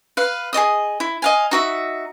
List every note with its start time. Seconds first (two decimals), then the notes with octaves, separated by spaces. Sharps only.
0.17 B4 F5
0.53 G#4 D5 D#5 D#6
1.00 E4
1.22 D#5 F5 G#5
1.51 D#4 F#4 E5